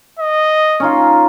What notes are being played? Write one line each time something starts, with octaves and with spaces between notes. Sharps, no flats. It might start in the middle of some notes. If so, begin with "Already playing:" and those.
D#5
C#4 D#4 F4